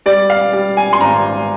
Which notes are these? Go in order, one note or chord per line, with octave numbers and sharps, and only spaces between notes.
G3 D5
F5
G3
G#5
C6
G#1 A#5